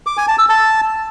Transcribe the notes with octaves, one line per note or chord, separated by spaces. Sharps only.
D6
G#5
A5
E6
A5